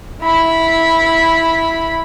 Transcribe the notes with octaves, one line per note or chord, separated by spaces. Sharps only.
E4 B5